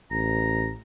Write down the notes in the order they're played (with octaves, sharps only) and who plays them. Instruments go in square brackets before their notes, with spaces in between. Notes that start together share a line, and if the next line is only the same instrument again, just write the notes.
[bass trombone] A1 [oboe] A#5